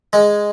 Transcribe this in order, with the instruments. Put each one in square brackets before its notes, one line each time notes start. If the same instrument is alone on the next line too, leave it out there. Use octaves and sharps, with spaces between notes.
[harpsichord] G#3